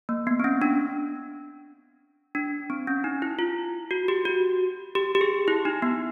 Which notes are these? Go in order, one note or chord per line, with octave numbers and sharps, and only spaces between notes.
A#3
B3
C4
C#4
D4
D4
C4
C#4
D#4
E4
F4
F#4
G4
F#4
G4
G4
G#4
E4
D#4
B3